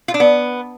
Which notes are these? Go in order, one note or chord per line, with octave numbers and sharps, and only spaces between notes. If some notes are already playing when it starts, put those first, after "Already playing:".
F4
D4
B3